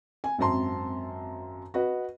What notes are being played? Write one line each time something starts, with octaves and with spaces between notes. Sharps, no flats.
G#5
G#1 F#2 C4 A5 A#5 C6
F#4 B4 D#5